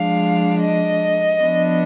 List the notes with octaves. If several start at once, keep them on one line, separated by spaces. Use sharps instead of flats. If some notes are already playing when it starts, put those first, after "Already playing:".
Already playing: F3 G#3 D4 F5
D#5
F3 B3 D4